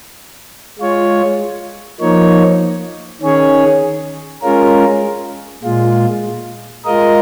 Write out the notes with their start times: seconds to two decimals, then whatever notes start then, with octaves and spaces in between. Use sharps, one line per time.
0.79 G#3 F4 C#5
2.00 F3 A#3 D#4 C#5
3.21 D#3 C#4 G#4 C#5
4.42 G#3 C#4 F4 A#4
5.63 A#2 G#3 F4
6.85 G#3 F4 A#4 D#5